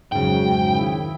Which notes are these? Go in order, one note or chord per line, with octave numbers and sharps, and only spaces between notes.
F2 G#2 C#3 F#3 G5
D#3 E4